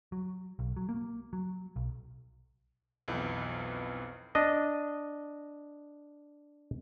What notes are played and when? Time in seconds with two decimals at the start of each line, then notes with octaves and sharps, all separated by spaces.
0.12 F#3
0.59 B1
0.77 F#3
0.89 A#3
1.33 F#3
1.76 B1
3.08 B1 F2 E3
4.35 D4 D#5